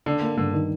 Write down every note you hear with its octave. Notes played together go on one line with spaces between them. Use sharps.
D3 D4
A#3
G2 D3
D#3